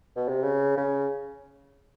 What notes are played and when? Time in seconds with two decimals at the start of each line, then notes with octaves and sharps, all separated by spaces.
0.16 B2
0.29 C3
0.43 C#3
0.77 C#3